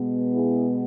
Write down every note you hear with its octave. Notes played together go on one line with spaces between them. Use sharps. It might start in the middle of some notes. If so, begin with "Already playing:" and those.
Already playing: B2 G#3 B3
E4 G#4